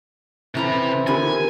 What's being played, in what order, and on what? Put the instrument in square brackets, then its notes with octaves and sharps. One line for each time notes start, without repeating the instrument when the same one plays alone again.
[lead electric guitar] C3 A#5 [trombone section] E3 C4 E4 [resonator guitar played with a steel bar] C#4 A4 B4
[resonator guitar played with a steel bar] D3 D#3 B3 [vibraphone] F4 G4 A#4 [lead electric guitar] G#5